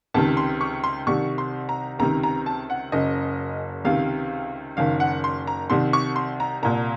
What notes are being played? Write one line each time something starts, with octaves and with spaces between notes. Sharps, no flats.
C#2 C3 D#3 A5
C6
C#6
C6
C2 C3 D#3 C#6
C6
A#5
C#2 C3 D#3 A#5
A#5
A5
F#5
F#1 F#2 C#3 D#5
C#2 C3 D#3 F5
F#1 F#2 D#3 F5
F#5
C6
A#5
C2 C3 D#3 C6
C#6
C6
A#5
C2 A#2 A#5